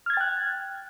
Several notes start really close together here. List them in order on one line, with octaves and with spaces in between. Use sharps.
F6 G#6 A6 G5 F#6